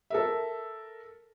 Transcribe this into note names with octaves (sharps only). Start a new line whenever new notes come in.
A4 A#4 E5